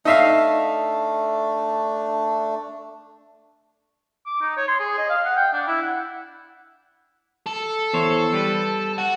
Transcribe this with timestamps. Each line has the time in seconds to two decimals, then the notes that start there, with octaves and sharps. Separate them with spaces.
0.05 A3 D4 D#4 E5 F5
4.26 D6
4.41 D#4
4.57 C#5
4.68 C6
4.80 G#4
4.98 D#5
5.10 F5
5.25 F#5
5.36 G5
5.53 D4
5.67 E4
5.82 F#5
7.47 A4
7.93 E2 C5 C#5
8.33 G3 B4
8.98 F#4